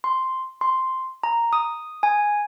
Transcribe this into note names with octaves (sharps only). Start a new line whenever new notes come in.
C6
C6
A#5
D#6
G#5